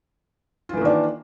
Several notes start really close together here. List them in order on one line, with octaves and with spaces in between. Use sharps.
F4 E3 A#3 D#3 D4